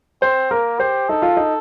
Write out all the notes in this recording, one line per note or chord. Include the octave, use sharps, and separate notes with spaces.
C4 C5
A#3 A#4
G4 C5
D#4 A4
F4
D#4